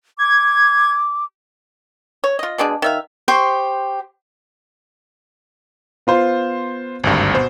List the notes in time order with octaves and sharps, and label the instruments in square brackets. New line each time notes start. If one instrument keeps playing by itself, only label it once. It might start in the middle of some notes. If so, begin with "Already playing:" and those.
[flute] D6 [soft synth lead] G#6
[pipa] C#5
F4 D#5
B2 G#3 D4 G#4
D#3 E5 F5
[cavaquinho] G4 C5 C6 C#6
[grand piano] B3 F4 C5
[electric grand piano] G#1 D2 G2
B2 C5